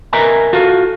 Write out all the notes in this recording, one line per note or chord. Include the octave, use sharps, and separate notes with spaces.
A#4 B4 D#5 E5 G#5 A#5
F4 F#4 A4 F5